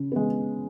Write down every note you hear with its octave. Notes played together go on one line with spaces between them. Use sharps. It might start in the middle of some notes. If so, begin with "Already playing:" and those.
Already playing: C#3
G#3 B3